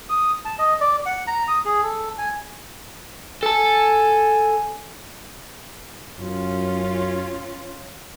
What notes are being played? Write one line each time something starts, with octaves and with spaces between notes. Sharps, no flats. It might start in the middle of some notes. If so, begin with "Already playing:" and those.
D#6
A5
D#5
D5
F#5
A#5
D#6
G#4
A4
G#5
A4 G#5 A5
F#2 C#4 F4